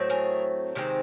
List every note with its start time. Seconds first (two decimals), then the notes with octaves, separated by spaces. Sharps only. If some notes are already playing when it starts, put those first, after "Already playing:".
Already playing: A2 F#3 A3 C4
0.10 G#4 A#4
0.75 C3 D#3 G#3 C4